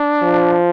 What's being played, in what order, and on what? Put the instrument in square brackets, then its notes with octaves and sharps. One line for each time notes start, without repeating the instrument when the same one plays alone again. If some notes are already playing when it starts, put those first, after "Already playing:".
Already playing: [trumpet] D4
[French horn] F3